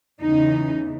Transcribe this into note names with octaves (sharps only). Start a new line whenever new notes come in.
E2 C#3 E3 D#4